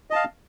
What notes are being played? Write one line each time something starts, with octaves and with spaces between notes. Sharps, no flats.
D#5 F5 A5